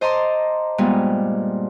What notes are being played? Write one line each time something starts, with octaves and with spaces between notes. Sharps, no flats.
C5 D#5 A5 A#5 C6 D6
G2 A#2 G3 G#3 B3